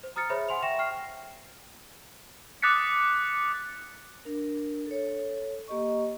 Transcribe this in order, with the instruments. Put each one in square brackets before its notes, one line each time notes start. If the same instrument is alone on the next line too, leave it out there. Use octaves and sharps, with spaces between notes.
[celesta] C5
A#5 D#6 F6 A6 C#7
G#4 C5 C#5 E5 B5
F#5 G#5 C6 F7
E5 G5 C#6 A#6 E7
G5 C#6 F6 C7
[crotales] D6 D#6 F#6 A6 B6 C#7
[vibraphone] D4 A#4
A4 C#5
A#3 G4 D#5 C#6